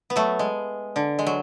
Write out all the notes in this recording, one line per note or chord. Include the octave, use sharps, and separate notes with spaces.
B3
F#3 A3
G#3
D3
G#3
F#3